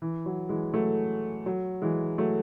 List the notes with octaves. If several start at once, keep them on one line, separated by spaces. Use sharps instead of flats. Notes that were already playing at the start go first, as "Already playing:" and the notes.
E3
F#3
E3 G#3
F#3 A3
F#3
E3 G#3
F#3 A3